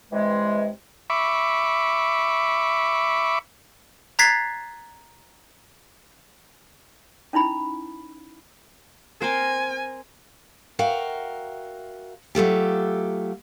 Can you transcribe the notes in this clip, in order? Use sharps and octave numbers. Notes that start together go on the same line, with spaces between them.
G2 C3 E3 G#3
E5 B5 C#6 D6
A#5 F#6 G#6 A6 B6 C7
C#4 D#4 E4 B5
C4 A#4 C5 G#5
F#4 A#4 E5 F5 G5
F#3 A3 F4 G4